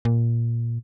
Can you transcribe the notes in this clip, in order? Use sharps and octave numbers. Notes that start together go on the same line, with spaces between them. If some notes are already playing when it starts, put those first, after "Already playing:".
A#2